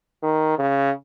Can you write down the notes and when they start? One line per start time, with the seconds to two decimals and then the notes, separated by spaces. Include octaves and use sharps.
0.23 D#3
0.59 C#3